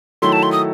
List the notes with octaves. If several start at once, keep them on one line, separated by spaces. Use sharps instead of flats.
D#3 F#3 A3 E4 C6
A5
C6
D#6